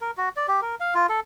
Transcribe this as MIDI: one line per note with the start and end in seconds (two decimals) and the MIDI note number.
0.01 0.11 70
0.18 0.29 66
0.36 0.47 74
0.48 0.61 67
0.62 0.75 70
0.80 0.94 77
0.95 1.07 65
1.09 1.20 69